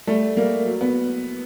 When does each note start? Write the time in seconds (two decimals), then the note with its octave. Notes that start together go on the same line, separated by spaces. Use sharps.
0.07 G3 A3
0.37 G3 A#3
0.66 F#3
0.81 B3